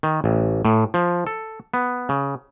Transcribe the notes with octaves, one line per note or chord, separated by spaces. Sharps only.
D#3
A1
A2
F3
A4
B3
C#3